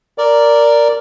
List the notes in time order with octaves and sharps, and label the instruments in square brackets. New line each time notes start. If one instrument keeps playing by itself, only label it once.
[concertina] A#4 D5